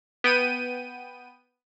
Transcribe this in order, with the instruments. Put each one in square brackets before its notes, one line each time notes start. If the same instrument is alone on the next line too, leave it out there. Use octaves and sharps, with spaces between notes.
[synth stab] B3 G5 D#7